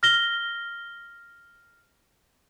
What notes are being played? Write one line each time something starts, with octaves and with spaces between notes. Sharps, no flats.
F6 A#6 G7